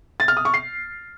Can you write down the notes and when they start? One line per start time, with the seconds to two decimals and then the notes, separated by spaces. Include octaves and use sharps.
0.20 A6
0.28 F6
0.37 D#6
0.45 C#6
0.54 C7